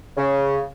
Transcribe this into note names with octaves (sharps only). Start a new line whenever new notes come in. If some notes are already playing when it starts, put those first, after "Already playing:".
C#3